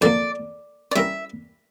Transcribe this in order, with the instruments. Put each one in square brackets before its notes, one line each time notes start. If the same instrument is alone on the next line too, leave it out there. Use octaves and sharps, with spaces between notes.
[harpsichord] F2 D3 F3 A#3 [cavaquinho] D5
[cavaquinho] D5
[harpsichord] G3 C#4 E4 A#4 [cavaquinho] E5